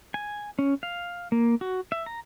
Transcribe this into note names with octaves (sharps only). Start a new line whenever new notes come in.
G#5
C#4
F5
A#3
F#4
E5
A#5